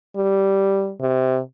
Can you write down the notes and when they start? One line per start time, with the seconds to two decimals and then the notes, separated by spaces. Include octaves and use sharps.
0.16 G3
1.01 C3